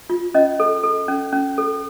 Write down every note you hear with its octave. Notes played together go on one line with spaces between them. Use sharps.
F4
C#4 D#5
A4
A4
C#4
C#4
A4